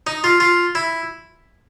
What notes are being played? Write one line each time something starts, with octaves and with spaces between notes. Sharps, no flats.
D#4
F4
F4
E4